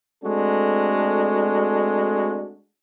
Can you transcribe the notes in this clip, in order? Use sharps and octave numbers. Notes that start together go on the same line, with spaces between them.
G#3 A3 C4 D4 F#4 A4